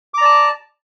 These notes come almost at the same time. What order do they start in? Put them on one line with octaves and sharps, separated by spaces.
D6 A#5 D5 A5